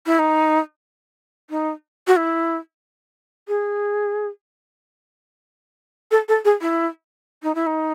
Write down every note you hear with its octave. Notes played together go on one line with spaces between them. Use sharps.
E4
D#4
D#4
F#4
E4
G#4
A4
A4
G#4
E4
D#4
E4
D#4